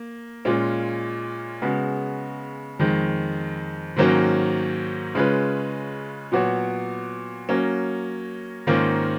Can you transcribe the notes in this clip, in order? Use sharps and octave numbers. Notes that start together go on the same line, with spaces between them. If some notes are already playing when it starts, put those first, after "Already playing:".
Already playing: A#3
A#2 G#3 C#4 F4
C#3 G#3 B3 F#4
F2 D#3 G#3
G#2 D#3 F#3 A#3 C#4
C#3 G#3 C#4 F4 B4
A#2 F#3 B3 F#4 C#5
F#3 A#3 C#4
G#2 D#3 A#3 C#4 F4